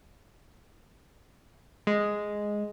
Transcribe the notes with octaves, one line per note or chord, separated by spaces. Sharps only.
G#3